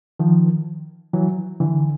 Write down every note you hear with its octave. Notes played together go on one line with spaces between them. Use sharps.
D#3 F3
E3 F#3
D3 E3